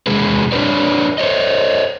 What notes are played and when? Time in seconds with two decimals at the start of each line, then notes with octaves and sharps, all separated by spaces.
0.07 E2 C3 G#3 G#4 B4
0.52 D4 A#4 B4 C#5 D5
1.18 C5 C#5 D#5